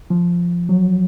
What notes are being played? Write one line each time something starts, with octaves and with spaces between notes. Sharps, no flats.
F3
F#3